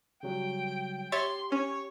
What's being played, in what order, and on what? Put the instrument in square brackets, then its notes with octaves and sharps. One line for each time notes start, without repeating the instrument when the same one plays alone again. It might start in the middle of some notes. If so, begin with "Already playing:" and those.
[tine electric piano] C#3 F#3 G3 [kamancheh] G5
[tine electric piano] G4 [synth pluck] C#5 E5 A6 [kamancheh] C6
[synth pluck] C#4 [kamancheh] C#5